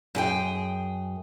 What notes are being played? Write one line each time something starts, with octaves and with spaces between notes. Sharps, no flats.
F#2 G#4 G5